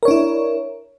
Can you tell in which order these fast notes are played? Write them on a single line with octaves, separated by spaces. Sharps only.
A#4 C#5 D4 E4